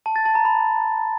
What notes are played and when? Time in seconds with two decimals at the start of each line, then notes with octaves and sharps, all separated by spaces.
0.06 A5
0.16 A6
0.25 A5
0.35 A#5
0.45 B5